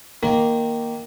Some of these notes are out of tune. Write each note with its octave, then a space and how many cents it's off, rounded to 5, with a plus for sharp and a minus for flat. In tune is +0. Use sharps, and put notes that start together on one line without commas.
D#3 +0 A#3 +0